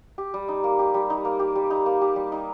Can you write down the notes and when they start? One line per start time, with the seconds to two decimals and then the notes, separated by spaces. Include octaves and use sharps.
0.18 G4
0.34 G3
0.48 D#4
0.64 A#3
0.79 G4
0.94 G3
1.10 D#4
1.25 A#3
1.39 G4
1.55 G3
1.71 D#4
1.86 A#3
2.01 G4
2.16 G3
2.32 D#4